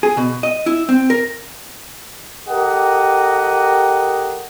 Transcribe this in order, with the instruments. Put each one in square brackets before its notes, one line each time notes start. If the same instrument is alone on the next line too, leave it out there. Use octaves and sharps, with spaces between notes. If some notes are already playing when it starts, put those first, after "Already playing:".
[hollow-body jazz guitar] G#4
B2
D#5
E4
C4
A#4
[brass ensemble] G4 A4 A#4 D#5 F#5